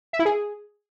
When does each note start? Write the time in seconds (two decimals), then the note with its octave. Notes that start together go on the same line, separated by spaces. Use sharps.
0.13 E5
0.19 E4
0.25 G#4